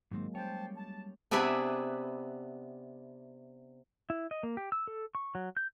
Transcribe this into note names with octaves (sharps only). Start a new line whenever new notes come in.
G#2 D#3 F#3 G#3 A#3 C4
G3 C#4 C5 C#5 G5 A5
A5
C3 B3 D4 E4 G#4 B4
E4
D#5
A#3
G4
E6
A4
C#6
F#3
G6